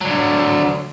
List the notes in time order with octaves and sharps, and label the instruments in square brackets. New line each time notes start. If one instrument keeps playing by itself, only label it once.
[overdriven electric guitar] D3 F#3